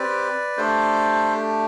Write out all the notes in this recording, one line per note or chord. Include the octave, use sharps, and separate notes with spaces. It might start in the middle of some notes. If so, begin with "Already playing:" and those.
Already playing: C4 G4 B4 D5
A3 D4 G4 A4 C5